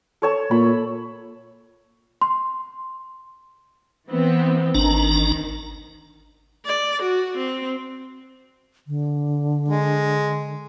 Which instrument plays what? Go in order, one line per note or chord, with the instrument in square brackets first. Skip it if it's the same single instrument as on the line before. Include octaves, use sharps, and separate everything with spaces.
[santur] A4 C#5 A5
[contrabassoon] A#2 [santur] B5
[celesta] C6
[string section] E3 B3 C4
[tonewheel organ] G#1 D4 A#5 [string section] D#3
[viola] D5
F#4
C4
[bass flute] D3
[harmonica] G#3